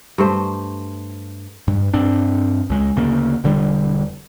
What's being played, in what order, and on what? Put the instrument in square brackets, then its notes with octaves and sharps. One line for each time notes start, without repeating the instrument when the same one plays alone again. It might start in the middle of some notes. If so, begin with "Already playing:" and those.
[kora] G2 A3 C5
[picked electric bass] G2
G2 C4 D4
C#2 G#3
D2 C#3 A#3
E1 D3 G3